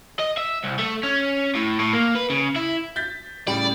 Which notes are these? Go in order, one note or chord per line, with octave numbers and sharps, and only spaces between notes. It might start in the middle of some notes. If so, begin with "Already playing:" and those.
D#5
E5
C2
A3
C#4
A2
A2
A#3
B4
C#3
E4
G6 A6 B6
A2 C#3 G3 D5